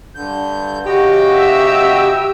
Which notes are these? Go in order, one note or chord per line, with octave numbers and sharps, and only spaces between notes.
G2 D3 G6
C#3 F#4 G4 D#5
E5 E6